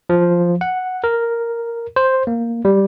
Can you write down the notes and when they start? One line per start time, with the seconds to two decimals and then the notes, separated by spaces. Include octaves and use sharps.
0.09 F3
0.61 F#5
1.04 A#4
1.96 C5
2.27 A#3
2.65 G3